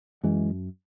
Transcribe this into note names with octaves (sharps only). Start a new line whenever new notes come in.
F#2 E3 G#3